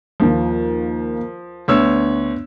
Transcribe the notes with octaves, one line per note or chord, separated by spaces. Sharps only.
D#2 F3 F4
D2 B3 D4 C#5 E6